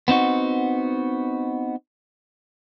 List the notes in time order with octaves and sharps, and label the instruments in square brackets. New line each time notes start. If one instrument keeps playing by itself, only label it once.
[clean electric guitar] B3 C4 D#4 F#4